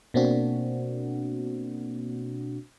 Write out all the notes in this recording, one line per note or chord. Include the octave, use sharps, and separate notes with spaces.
B2 A#3 C4 D4 F#4